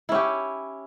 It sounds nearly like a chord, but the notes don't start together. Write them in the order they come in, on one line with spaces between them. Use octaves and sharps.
E4 C#4 G4